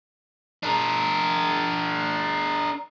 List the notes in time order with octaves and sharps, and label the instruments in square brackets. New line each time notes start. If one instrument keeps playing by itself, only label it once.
[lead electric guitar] D4 A#4